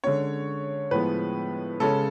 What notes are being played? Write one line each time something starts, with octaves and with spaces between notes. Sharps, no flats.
D3 G#3 C#4 C#5
A2 F3 G#3 B3 B4
C#3 G#3 C#4 A4